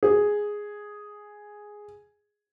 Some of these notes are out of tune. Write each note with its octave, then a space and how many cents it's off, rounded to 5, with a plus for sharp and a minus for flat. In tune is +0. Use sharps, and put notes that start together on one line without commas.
G#4 +0